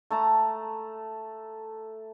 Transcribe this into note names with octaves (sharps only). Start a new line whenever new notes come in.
A3 A5 A#5